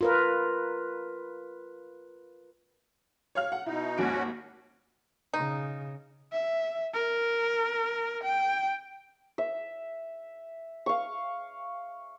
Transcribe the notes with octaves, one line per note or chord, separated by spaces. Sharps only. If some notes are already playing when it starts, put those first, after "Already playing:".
F4 A#4 B4
C#5 F5 F6
F#5
B2 D#4 E4
G#1 D#2 C#4 F#4 D7
C#3 D#4
E5
A#4
G5
E5
F5 C#6